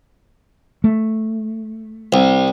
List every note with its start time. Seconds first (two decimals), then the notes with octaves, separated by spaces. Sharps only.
0.84 A3
2.13 C2